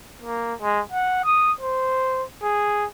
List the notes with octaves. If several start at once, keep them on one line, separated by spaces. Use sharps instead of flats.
A#3
G#3
F#5
D#6
C5
G#4